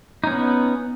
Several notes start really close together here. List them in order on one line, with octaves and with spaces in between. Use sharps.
D#4 C#4 B3